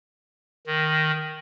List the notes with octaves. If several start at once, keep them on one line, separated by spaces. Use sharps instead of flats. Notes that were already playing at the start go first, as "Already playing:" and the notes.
D#3